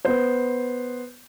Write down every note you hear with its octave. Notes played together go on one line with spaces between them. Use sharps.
B3 C5